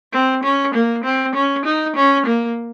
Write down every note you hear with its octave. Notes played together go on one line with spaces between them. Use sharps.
C4
C#4
A#3
C4
C#4
D#4
C#4
A#3